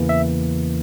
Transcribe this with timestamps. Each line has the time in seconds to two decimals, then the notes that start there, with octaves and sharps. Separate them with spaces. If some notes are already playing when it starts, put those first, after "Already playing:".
Already playing: E2 C#3 E3 A#3
0.09 E5